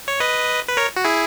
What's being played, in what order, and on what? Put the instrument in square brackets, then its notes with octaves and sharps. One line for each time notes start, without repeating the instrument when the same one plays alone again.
[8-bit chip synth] C#5
B4 D#5
B4
A#4 C#5
F#4
E4 G#4